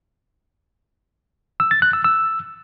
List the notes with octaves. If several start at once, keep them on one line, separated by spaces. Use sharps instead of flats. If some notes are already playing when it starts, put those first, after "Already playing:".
E6
A6
F#6
E6
E6